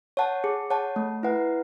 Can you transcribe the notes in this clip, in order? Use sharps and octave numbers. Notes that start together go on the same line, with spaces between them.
C#5 F#5 A5
G#4
C#5 F#5 A5
A3
E4 B4 F#5